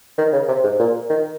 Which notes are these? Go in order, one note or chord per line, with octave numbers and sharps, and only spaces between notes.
D#3
C#3
C3
G#2
A#2
D#3